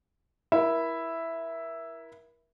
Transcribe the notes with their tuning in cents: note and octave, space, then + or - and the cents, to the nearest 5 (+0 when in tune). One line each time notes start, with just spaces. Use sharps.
E4 +0 A#4 +35 E5 +0